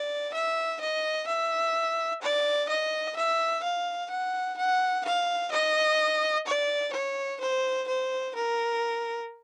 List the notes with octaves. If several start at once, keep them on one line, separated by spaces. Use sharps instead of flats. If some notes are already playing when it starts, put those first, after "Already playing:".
Already playing: D5
E5
D#5
E5
D5
D#5
E5
F5
F#5
F#5
F5
D#5
D5
C#5
C5
C5
A#4